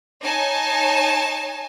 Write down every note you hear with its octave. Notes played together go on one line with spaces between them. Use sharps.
D#4 C#5 G#5 A5